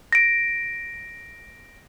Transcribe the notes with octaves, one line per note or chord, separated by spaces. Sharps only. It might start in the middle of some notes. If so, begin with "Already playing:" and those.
A#6 D7